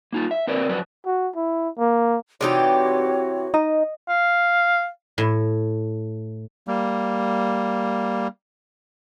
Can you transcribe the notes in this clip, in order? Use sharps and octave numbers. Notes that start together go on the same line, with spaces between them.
A#3 D#4 F4
E5
C4 A#4 B4 C#5 D5
F2 F#3 B4 D5
F#4
E4
A#3
C3 E3 D#4 F#4 G4 C#5 D5
D#4 D#5
F5
A2
G3 A#3